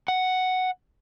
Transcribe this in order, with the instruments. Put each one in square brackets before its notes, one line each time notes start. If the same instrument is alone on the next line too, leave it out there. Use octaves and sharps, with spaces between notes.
[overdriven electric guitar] F#5